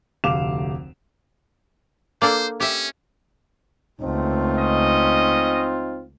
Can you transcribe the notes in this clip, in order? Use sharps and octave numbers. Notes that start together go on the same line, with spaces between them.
F1 D2 F5 D6 E7 F7
A#3 D4 A4 C5
C#4 G4 E5
C#2 A3 C4 D#4 F4
C#4 D#5